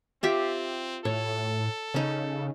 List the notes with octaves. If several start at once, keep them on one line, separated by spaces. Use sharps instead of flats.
C4 F4 G4 E5
A2 A4 C#5
C#3 C#4 D#4